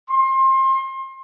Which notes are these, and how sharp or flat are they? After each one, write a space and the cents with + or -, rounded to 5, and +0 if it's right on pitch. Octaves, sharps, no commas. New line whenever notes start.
C6 +30